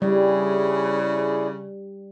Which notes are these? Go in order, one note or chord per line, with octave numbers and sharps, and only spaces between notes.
C#3 G3 E4 G#4 D5